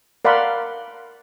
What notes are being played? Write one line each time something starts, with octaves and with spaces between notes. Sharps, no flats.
A#4 D5 F5 F#5 B5 C6